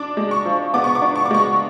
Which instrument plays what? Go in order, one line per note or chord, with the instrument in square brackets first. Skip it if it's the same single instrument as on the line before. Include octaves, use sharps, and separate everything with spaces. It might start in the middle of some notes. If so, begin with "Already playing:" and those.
Already playing: [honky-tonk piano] D4 D6
G#3
C#6
F3
B3 D6
C#6
D6
D4
C#6
D6
G#3 C#6